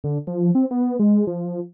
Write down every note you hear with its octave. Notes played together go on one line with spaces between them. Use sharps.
D3
F3
C4
B3
G#3
F3